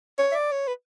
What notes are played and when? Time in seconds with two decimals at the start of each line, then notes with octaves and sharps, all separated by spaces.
0.19 C#5
0.32 E5
0.35 D5
0.52 C#5
0.67 B4